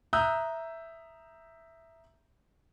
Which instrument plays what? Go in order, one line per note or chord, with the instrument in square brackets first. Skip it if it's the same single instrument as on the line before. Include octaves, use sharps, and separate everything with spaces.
[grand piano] E5 A#5 D#6 E6 F#6 G6